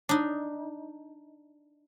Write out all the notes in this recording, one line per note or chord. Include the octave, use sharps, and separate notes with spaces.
D4 D#4